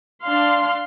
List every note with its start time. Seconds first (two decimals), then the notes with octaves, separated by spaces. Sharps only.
0.23 D4 F5 C6